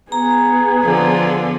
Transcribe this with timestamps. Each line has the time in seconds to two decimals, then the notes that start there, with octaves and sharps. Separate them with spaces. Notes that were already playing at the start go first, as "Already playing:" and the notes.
0.12 B3 G#4 A#5
0.83 D3 F3